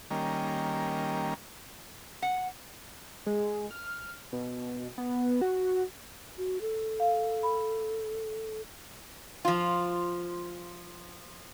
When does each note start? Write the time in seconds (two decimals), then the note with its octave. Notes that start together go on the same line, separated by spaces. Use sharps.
0.11 D#3 G3 A#3 C#4
2.22 F#5
3.26 G#3
3.71 F6
4.33 B2
4.98 B3
5.41 F#4
6.38 F#4
6.61 A4
7.00 F5
7.43 B5
9.45 F3 F4